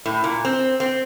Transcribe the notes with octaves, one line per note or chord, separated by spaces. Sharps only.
A2
A#2
C4
C4